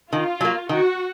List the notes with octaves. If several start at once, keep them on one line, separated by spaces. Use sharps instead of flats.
D#3 F4
F#3 A#3
D#3 F#4